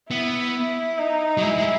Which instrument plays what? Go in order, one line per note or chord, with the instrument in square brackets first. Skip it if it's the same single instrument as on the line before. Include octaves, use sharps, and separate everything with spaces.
[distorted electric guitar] B3 [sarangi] E4
[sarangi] D#4
[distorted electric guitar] F#3
[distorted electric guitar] G#3 [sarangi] E4
[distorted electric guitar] G#3